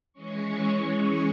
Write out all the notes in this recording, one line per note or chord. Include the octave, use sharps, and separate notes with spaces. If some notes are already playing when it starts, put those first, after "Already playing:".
E3 G#3 C#4 C#6